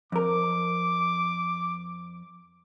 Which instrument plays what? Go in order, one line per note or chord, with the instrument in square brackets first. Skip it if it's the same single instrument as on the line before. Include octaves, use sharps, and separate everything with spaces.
[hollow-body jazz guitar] F2 A#4 [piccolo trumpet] D6